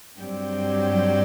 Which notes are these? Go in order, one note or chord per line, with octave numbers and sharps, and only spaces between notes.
G2 F#3 C4 G4 D5